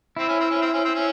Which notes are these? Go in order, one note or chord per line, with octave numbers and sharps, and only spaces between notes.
C4 E4
C#4
C4
C#4
C4
C#4
C4
C#4